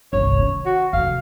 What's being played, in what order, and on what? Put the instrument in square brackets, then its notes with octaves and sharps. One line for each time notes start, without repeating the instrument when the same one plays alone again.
[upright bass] G1 C2 [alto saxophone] C#5
[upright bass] D#3 C#4
[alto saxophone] F#4
[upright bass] F1 F2 [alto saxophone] F5